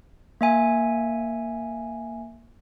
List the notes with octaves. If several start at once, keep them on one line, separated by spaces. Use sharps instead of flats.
A#3 E5 G#5